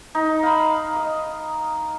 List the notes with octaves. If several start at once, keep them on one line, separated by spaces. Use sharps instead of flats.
D#4
F5 B5
D#5